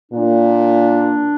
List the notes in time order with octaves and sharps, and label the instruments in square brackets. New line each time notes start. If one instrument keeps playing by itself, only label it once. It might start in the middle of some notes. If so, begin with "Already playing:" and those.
[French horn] A#2 [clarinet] D4